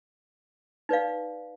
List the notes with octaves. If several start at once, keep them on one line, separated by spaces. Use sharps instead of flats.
D#4 B4 D5 F5